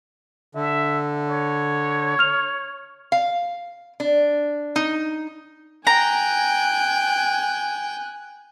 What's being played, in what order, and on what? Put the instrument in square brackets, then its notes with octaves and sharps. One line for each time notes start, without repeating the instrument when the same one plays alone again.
[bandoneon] D3 [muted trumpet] E5
[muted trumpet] C#5
[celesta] F6 F7
[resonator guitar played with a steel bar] F5
D4
D#4
[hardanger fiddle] G5 [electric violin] G#5 F#6 [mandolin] A#5